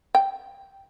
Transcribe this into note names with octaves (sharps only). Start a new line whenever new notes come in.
G5